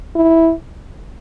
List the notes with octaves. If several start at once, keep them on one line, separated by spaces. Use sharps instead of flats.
E4